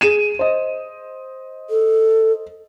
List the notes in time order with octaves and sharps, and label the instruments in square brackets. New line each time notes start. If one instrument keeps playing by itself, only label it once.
[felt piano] G#4 D#7 E7
C5 D#5
[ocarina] A4